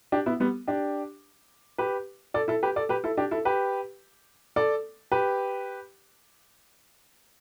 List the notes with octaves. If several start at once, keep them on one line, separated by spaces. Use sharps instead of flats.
D4 G4
B3 E4
G3 B3
D4 G4
G4 B4
A4 D5
E4 A4
G4 B4
A4 D5
G4 B4
E4 A4
D4 G4
E4 A4
G4 B4
A4 D5
G4 B4